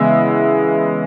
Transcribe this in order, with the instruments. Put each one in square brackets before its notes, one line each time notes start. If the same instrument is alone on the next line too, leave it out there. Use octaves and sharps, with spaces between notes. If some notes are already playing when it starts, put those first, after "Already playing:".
Already playing: [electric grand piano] C#3 E3 G#3 B3 E5